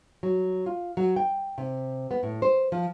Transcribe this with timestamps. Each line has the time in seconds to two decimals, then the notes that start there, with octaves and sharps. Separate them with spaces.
0.23 F#3
0.66 F4
0.97 F#3
1.16 G5
1.58 C3
2.11 B3
2.23 A2
2.42 C5
2.72 F3